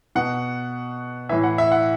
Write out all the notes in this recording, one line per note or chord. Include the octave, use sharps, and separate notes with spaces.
B2 F#5
A2 E3 E5
F#5
E5
F#5